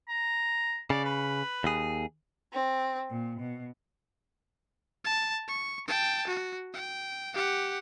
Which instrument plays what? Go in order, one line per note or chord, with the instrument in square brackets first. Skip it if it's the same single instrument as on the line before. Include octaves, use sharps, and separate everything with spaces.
[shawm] A#5
[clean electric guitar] C#3 [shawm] D5
[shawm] B4
[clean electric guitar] D#2 G#4
[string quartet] C4
A#2
B2
[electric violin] A5
C#6
G5 A5
F#4
G5
G4 F#5